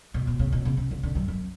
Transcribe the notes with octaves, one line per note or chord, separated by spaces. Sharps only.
B2
B2
C#3
B2
C#3
B2
C#3
D3
F#2
F#2